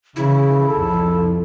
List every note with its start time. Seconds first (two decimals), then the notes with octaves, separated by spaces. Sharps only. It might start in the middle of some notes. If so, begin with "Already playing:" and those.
0.16 C#3 E3 E4
0.69 C2 F2 A4